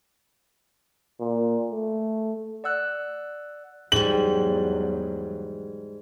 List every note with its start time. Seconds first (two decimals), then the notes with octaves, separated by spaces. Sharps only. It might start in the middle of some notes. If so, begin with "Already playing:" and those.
1.19 A#2
1.71 A3
2.64 D5 F#5 E6 F#6
3.92 E2 G#2 F#3 G3 F#7